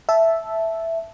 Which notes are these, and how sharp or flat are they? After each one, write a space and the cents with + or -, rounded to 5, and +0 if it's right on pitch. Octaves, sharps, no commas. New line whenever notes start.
E5 +0 A5 -10